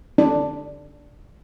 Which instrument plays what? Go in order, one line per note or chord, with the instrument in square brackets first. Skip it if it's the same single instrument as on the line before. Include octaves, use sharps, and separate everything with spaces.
[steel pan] D4